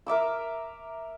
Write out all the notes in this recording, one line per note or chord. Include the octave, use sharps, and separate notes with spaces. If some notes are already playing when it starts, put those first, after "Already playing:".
A#4 E5 D6 E6